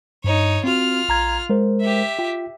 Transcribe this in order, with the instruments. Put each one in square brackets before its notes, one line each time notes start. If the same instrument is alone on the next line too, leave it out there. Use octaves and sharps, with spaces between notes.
[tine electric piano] G2 [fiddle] D#4 C#5
[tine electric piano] C4 F#4 [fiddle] F4 F6
[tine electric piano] A#1 A#5 G#6
G#3 A#4 C5
[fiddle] G4 E5
[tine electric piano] F4 G5